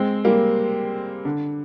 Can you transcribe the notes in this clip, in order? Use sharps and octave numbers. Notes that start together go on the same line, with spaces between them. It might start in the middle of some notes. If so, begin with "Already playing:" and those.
Already playing: G#3 C4
G3 A#3
D3